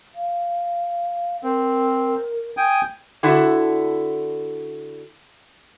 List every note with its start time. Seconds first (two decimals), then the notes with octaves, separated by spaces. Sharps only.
0.15 F5
1.43 C4 A#4
2.57 G5 G#5 D#6
3.23 D3 E4 F#4 A4